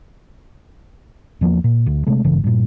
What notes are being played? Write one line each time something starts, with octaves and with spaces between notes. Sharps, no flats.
E2 F3 F#3 A#3
A#2
D2
C3 G#3 A3
G#1 G2 C#3 E3
G2 A#2